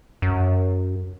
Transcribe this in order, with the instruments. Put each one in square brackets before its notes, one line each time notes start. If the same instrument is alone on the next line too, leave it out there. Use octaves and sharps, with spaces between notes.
[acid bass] F#2